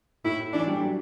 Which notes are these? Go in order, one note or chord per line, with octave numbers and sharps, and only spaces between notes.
A2 E4
A2
E3 D4
G3
F#3